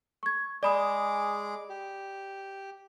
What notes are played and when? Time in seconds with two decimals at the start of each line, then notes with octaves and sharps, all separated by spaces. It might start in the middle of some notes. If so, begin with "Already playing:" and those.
0.23 C#6 G#6
0.63 G#3 G#4 D5 B5 D6 D#6
1.70 G4